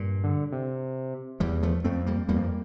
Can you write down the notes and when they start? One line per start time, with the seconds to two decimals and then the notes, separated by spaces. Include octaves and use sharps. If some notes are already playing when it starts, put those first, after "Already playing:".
Already playing: G2 A#2
0.24 D3
0.52 C3
1.40 E2 E3 G3
1.63 F3 A3
1.84 F2 A3 C4
2.06 G3 A#3
2.29 E2 G3 A#3
2.37 F2